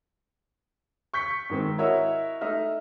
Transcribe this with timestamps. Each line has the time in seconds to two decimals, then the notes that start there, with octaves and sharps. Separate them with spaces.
1.14 C#6 G6 B6 C#7
1.50 G#2 D#3 C4
1.78 E4 F#4 A#4 C#5 D#5 E5
2.41 A3 D#4 D#5 E5 F6